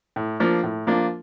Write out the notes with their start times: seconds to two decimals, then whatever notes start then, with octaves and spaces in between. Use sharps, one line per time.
0.16 A2
0.40 F3 A#3 D4 F4
0.63 A2
0.87 F3 A#3 D4 F4